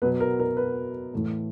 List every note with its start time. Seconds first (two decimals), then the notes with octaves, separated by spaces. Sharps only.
0.02 B2 F#3 B3 B4
0.20 A#4
0.39 A#4
0.57 B4
1.13 A2 E3 A3